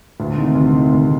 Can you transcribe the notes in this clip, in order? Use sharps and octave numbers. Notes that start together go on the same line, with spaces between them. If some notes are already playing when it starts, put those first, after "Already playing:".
D2
C3 D#3
D2
C3 D#3
D2